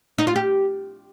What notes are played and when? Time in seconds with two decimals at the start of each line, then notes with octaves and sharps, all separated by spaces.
0.18 D#4
0.27 F4
0.36 G4